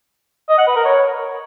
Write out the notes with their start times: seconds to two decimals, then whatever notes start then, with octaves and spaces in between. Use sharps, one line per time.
0.49 D#5
0.58 F#5
0.67 B4
0.76 A#4
0.85 C#5